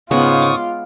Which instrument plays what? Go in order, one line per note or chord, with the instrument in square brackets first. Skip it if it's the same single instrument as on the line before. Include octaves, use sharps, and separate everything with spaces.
[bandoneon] G#2 C#6 D#6 [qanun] C#3 G#3 B3 [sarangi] F4
[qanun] D6